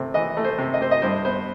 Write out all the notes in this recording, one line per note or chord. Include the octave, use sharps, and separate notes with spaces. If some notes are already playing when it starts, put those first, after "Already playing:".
Already playing: C3 A3
E3 D#5
A3
C5
C3
D#5
C3 C5
D#5
G2 C5
B3 C5